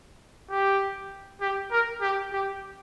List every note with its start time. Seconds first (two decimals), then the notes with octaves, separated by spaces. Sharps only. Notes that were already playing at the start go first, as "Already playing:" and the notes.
0.51 G4
1.41 G4
1.71 A#4
2.02 G4
2.32 G4